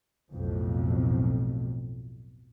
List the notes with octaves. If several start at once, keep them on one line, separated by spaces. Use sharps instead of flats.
B1 F2 A2